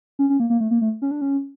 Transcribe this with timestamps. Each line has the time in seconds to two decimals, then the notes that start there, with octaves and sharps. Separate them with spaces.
0.19 C#4
0.30 C#4
0.40 A#3
0.50 A#3
0.60 A3
0.71 A#3
0.81 A3
1.02 C#4
1.11 D4
1.21 C#4